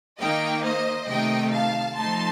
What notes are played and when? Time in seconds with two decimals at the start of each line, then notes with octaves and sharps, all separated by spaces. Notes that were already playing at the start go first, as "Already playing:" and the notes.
0.19 D#3 A#3 D#4 D#5 G5
0.63 C5 D#5
1.08 C3 D#3 A3 D#4 D#5 G5
1.51 F5 A5
1.96 F3 A3 D#4 A5 C6